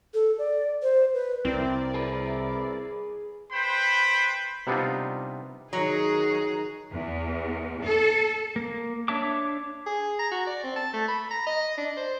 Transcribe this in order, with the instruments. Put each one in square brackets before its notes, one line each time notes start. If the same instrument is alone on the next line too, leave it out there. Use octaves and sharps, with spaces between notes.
[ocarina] A4
D5
C5
B4
[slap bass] C2 [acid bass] C4 [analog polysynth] E4 A#4 D5
[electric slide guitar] G#4 B4
[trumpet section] B4 C5 G5 B5
[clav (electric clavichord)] C3 G3 B3 D4 D#4 F4
[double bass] D#3 [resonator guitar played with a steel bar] F#3 [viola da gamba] G#4 [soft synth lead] A#5
[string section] E2
A4
[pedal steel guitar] A#3
D4 C#5 E5 A5 D6
[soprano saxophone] G#4
A#5
F#4
D5
C4
A5
A3
B5
A#5
D#5
D4
C5